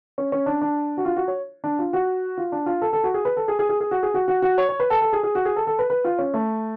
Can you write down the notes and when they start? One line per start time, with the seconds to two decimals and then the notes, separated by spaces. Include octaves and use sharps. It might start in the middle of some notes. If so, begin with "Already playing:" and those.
0.18 C#4
0.32 C#4
0.46 D4
0.62 D4
0.97 F#4
1.05 F4
1.16 F#4
1.28 C#5
1.64 D4
1.79 F4
1.93 F#4
2.38 F4
2.52 D4
2.66 F4
2.81 A4
2.93 A4
3.04 F#4
3.14 G#4
3.25 B4
3.37 A4
3.48 G#4
3.59 G#4
3.69 G#4
3.80 G#4
3.91 F#4
4.03 G#4
4.14 F#4
4.28 F#4
4.42 F#4
4.58 C#5
4.69 C#5
4.80 B4
4.90 A4
5.02 A4
5.13 G#4
5.23 G#4
5.35 F#4
5.45 G#4
5.56 A4
5.67 A4
5.79 B4
5.90 B4
6.05 F4
6.18 C#4
6.34 A3